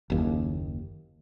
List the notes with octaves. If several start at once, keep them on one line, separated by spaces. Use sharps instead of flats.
F#1 D#2